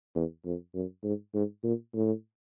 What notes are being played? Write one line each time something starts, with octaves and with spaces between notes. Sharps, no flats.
E2
F2
F#2
G#2
G#2
A#2
A2